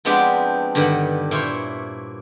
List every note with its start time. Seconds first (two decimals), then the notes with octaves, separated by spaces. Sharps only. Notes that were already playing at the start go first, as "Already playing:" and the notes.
0.05 F3 G#3 B3 C4 D4 G4
0.75 G2 D3 D#3 B4 F#5
1.31 A#2 E4 C5 C#5